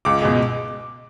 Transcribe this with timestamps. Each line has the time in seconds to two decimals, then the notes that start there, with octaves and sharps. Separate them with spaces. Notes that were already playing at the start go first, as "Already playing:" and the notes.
0.05 C#2 D6
0.22 B2 G#3